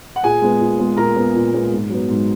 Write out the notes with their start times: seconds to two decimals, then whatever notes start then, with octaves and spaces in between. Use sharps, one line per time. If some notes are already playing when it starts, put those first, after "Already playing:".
0.16 F#5
0.23 A#2 G#4 G#5
0.41 G#3 B3
0.61 A#2
0.79 G#3 B3
0.97 A#2 A#4 A#5
1.16 G#3 B3
1.35 A#2
1.53 G#3 B3
1.72 G#2
1.89 F#3 B3
2.08 G#2